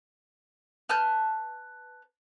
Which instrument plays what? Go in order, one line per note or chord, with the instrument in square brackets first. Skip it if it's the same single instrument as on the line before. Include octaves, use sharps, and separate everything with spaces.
[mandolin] B4 A5 F6 G6